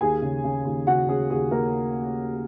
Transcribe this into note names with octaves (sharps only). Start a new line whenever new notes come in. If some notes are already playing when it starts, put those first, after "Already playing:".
D#2 G#4 G#5
C#3
C#3
D#2
C#3 F#4 F#5
C#4 G#4
D#2 G#4
A#3 A#4